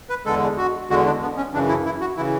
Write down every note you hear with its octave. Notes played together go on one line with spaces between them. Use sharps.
B4
E2 D3 G#3 A4
F#4
E2 D3 G#3 F#4
D4
B3
C#4
F#2 C#3 E3 D4
E4
E4
F#4
C#3 E3 E4